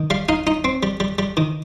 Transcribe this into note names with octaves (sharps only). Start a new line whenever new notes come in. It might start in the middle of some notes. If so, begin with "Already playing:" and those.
Already playing: D#3
G3 F5
D#4 F5
D#4
C4
G3
G3
G3
D#3